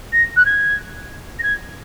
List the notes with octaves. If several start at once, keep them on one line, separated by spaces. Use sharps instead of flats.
A#6
F#6
G#6
A#6
G#6